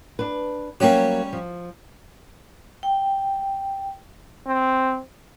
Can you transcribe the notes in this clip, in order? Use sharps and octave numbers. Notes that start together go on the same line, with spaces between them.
D4 B4
F#3 G3 A#3 C#4 G4
F3
G5
C4